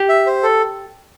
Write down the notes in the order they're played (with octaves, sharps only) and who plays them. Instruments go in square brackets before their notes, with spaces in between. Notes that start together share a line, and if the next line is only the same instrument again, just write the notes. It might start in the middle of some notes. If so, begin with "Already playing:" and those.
Already playing: [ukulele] G4
[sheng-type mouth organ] E5
C5
A4